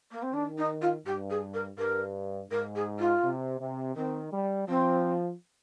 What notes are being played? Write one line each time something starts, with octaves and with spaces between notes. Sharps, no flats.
A#3
C4
D#3 D4
D#4
F4
G2 G4
G#4
A#4
G2 A#4
G#2 A#4
G#4
F4
C3
C3
D#3 C4
G3
F3 C4